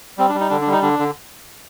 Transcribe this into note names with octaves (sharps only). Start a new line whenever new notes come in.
G3 C4
D4
G3
D#4
D3 D4
D4
G3
D#4
D3 D4
D3